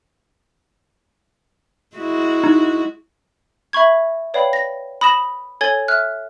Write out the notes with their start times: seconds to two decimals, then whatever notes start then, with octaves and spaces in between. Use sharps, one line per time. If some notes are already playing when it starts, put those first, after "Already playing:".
1.96 G#3 E4 F#4
2.44 D#4
3.73 E5 B5 C#6 G#6
4.34 B4 C#5 D5 F5 G5 B5
4.53 A#6
5.01 B5 D#6 A#6 E7
5.61 A4 C#5 G#5 G#6 A6 G7
5.88 E5 F6 F#6